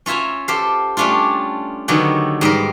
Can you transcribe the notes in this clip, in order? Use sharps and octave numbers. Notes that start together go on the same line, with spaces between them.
C#4 F4 E5 G#5 A#5
G4 A4 C5 F5
G3 A3 C#4 D4 F4
D3 D#3 F#3 B3 C#4 G4
G#2 G3 B3 A#4